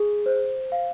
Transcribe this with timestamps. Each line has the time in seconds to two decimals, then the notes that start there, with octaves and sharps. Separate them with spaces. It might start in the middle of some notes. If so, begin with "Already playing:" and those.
Already playing: G#4
0.26 C5
0.72 F5